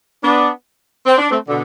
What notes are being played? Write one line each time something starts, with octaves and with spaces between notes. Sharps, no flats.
B3 D4
C4
D4
A3 C4
B2 D3